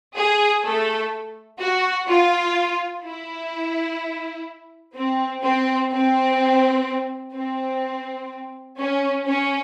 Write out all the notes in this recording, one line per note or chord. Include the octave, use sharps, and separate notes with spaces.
G#4
A3 A4
F#4
F4
E4
C4
C4
C4
C4
C#4
C#4